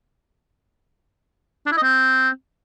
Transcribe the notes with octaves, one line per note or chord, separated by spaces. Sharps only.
D4
E4
D#5
C4